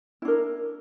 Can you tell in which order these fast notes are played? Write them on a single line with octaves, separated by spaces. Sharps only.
E4 D4 A#4